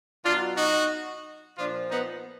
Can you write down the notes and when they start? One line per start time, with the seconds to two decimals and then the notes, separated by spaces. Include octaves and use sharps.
0.24 B2 F#3 D4 F4
0.57 D#4 F#4
1.57 A#2 F3 D4 F4
1.91 B3 D#4